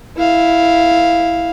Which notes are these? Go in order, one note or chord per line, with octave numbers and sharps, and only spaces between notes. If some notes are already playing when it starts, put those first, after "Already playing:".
E4 F5